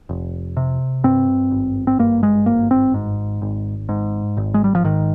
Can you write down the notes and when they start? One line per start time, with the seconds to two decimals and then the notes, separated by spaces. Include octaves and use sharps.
0.09 F1
0.57 C3
1.04 G2 C4
1.51 G#1
1.87 C4
1.99 G2 A#3
2.23 G#3
2.46 G#1 A#3
2.71 C4
2.94 G#2
3.42 G#1
3.89 G#2
4.37 G#1
4.54 G#3
4.64 G3
4.75 F3
4.84 G#2 D#3